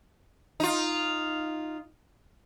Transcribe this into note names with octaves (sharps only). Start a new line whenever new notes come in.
D#4 F4